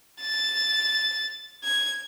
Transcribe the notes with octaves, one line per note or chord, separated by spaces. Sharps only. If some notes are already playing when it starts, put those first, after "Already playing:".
A6
G#6